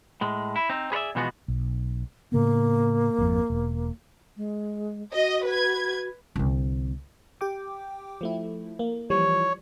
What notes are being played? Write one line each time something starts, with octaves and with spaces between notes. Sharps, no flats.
A2 G#3
E4
C4 D#4
G#4 B4 C#5 D5 E5
B2 E3 F3 G#3 B3 F#4
B1
A2 C#3 A#3 B3
G#1 F2
E1
G#3
F#4 D#5
B4 G#6
C2 D3
G4 G5 D6
F3 A3 E4
A#3
E3 F3 G3 C#5